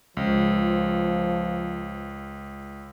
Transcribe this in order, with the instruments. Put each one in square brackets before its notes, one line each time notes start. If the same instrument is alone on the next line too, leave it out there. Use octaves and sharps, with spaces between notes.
[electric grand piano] C#2 [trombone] F3